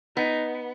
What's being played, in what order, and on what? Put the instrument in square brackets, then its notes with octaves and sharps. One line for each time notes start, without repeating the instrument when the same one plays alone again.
[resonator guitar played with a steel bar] B3 [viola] D#4